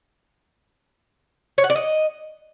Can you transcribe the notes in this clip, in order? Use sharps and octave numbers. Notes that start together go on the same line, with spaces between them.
C#5
F#5
D5
D#5